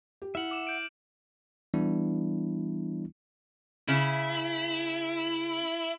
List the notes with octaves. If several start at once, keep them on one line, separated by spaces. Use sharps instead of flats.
G4
E4 E5 F#5 F6 F#7
D6 E7
G6 D7
E3 G3 B3 D4 E4
C#3 E4